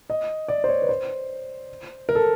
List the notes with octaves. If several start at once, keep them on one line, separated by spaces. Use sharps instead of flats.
D#5
D5
C5
C#5
B4
C5
A#4
A4